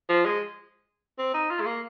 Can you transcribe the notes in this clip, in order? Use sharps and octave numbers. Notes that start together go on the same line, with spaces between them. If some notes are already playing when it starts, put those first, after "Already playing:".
F3
G#3
C4
D#4
F4
G#3
A#3